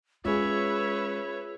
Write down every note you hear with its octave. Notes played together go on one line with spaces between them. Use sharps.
G#3 C#4 F4 G#4 B4 C#5 E5